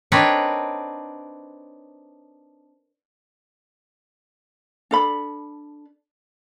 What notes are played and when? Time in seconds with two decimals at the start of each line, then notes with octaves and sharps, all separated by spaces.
0.12 C4 D4 D#4 A#4 B4 C#5
4.91 D4 A4 B5